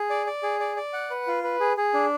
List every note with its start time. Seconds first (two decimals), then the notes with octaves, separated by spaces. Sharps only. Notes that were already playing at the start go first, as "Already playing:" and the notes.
Already playing: G#4
0.10 D5
0.26 D5
0.43 G#4
0.60 D5
0.76 D5
0.93 F#5
1.10 B4
1.27 F4
1.44 B4
1.60 G#4
1.77 G#4
1.94 D4